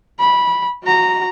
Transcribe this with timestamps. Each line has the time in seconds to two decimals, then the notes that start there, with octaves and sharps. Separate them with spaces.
0.19 B5
0.84 F#4 A#5